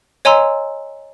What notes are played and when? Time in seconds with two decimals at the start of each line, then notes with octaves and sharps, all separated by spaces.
0.25 C#5 D#5 G#5 A#5 C6 E6